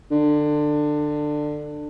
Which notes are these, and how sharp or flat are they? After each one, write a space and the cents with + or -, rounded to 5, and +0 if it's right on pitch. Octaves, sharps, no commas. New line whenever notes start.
D3 +20